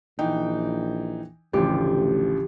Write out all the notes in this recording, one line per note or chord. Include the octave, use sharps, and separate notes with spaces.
A#1 E3 D#4 G5
A1 D2 C#3 F3 G4